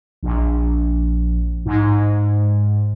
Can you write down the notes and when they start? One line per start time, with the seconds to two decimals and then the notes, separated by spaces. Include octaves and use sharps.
0.23 A#1
1.66 G#2